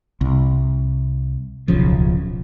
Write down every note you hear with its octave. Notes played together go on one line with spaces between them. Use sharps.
C2
D1 B1 C#3 F3